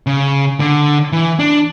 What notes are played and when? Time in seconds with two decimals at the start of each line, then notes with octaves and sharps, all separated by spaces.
0.07 C#3
0.60 D3
1.12 E3
1.39 D4